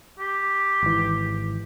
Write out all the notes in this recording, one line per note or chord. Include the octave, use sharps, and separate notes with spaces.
G4
G#1 E3